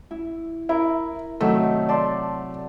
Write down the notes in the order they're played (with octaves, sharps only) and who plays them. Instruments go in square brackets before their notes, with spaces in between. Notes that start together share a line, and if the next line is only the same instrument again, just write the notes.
[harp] E4
[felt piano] E4 [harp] A#4
[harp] C3 D#3 F#3 [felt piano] A3
[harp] D5 A5 C6